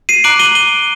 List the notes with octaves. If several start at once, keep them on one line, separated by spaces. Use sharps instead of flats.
C7 D#7
A#5 D6 F#6 D7 F#7
D#7 G7
D#7 G7